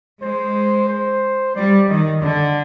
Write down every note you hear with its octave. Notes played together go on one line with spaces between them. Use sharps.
G#3 C5
C5
G3 D5
D#3 D#5
D3 D5